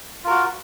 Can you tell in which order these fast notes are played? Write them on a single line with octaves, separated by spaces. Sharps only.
F4 A#4 F#4